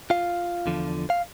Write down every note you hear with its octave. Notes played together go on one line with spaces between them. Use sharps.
F4 F5
E2 D3 F3
F5